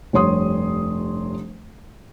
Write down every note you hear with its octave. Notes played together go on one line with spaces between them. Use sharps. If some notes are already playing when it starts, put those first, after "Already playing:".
F1 G2 C#5 C6 D#6